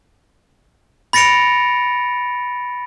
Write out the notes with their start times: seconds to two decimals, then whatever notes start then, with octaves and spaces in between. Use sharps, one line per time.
1.13 B5 A6 A#6 C#7 D7 F7